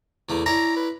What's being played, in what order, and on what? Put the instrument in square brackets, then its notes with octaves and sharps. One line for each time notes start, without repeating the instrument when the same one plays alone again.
[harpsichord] E2 A3 A#3
[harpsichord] E4 C#5 D5 [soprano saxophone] A#5
[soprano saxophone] B4